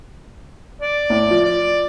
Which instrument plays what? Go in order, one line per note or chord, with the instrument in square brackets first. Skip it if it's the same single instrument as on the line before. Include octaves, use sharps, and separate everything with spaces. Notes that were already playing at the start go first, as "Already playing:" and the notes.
[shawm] D5
[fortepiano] A2
F3
[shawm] D5